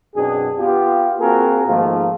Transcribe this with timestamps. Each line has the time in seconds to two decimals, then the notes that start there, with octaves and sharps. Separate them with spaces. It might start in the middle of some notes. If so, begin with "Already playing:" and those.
0.16 F#2 B2 C4 D4 G#4
0.58 B3 F4 G4
1.20 A#3 C4 F4 F#4 G#4 A#4
1.67 G#2 D#3 F3 A3 A#3 F4